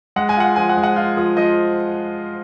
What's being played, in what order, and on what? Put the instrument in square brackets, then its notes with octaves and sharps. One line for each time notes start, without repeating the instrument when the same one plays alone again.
[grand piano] G#3 F#5
G#5
F4 F#5
F3 G#5
F#5
G#3
F#5
F4
F3
F3 D#5